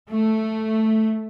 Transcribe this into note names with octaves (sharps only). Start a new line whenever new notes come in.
A3